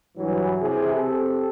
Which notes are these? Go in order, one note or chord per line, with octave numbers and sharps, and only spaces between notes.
G2 E3 F#3
C3 E3 G#4
C4 G4 A4